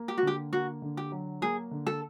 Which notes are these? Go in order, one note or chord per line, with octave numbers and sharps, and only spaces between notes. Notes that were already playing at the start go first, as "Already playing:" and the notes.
Already playing: A#3
G4
F#4
D3 G4
A#3 F#4
D3
G4
F#3
A#3 G#4
D3
A4